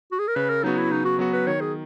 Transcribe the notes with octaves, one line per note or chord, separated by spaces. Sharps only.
F#4
G#4
A#4
C#3 B4
A#4
F#3 B3 D#4 F#4
E4
C#3 D#4
F#4
F#3 B3 F#4
B4
D#3 C#5
G#4